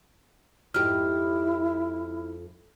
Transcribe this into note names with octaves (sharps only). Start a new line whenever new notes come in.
F2 G#2 E4 G4 F6